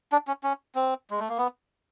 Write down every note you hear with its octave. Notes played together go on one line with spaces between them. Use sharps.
D4
C#4
C#4
C4
G#3
A3
A#3
B3